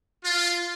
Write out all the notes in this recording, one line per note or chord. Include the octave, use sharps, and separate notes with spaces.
F4